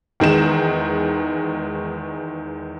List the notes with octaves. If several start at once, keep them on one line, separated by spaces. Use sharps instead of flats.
E2 D#3 G#3 E7